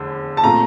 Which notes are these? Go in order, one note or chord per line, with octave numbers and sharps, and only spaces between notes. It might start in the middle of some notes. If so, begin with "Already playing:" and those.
Already playing: F1 E2 D3
A5
A#2 A3 C4 F4 A#5